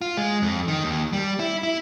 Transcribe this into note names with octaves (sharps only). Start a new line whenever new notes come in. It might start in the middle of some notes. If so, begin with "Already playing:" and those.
F4
G#3
F2
D#3
D#2
G3
E4
E4